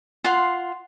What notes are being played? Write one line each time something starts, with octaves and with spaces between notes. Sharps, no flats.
F4 F5 F#5 C6